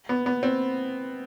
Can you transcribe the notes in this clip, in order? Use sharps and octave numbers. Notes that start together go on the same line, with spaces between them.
B3
B3
C4